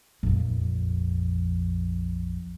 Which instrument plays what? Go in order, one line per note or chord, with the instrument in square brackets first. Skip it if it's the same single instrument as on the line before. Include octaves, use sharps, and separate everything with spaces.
[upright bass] A#1 F2